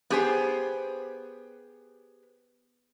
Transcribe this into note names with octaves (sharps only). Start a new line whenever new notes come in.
B3 G4 G#4 C5